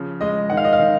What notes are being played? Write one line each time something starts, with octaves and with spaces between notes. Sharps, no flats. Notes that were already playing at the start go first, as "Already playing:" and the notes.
Already playing: C#3 F3
G#3 D#5
D#3 F#5
F5
D#5
F5
D#3